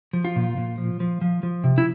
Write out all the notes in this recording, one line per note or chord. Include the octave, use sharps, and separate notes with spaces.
F3
F4
A#2
A#2
F3
F3
F3
F3
C3
E4